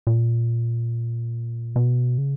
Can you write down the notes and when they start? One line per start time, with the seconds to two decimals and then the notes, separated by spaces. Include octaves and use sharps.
0.07 A#2
1.76 B2
2.18 C#3